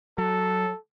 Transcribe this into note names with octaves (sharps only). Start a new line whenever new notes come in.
F#3 A4